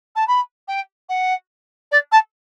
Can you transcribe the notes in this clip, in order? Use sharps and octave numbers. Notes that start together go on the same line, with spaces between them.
A5
B5
G5
F#5
D5
A5